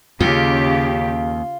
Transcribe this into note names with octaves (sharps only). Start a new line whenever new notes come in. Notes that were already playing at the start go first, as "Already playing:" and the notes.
D#2 C#3 F4 G4